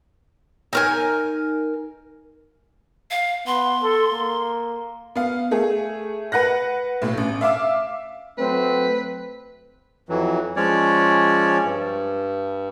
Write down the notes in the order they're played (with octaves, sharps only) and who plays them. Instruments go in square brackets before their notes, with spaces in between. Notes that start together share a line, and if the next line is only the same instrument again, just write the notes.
[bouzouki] D#4 A#4 G#5
[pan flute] F5
[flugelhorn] B3 [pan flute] C6
[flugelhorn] A4
A#3
[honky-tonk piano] B3 F5
A3 G#4
B4 F#5 F#6 A#6
B1 A2
A1
E5 F5 D6 E6
[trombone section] F#3 A3 C4 [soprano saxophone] B4
[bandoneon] F2 E3 F#3
F3 G#3 C#4 C#5 D5
G2